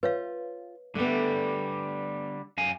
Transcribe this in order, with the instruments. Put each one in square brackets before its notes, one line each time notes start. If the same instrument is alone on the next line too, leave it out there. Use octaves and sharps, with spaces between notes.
[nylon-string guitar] F4 [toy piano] B4 C#5 F5
[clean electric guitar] D3 G3 [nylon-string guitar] A3 B3
[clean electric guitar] F#2 F5 G#5